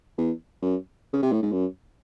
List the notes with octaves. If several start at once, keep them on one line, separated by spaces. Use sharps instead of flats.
E2
F#2
C#3
C3
A2
G#2
F#2